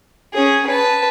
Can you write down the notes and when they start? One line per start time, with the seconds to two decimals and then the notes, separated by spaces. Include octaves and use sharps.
0.34 C#4 G#4
0.67 B4 A5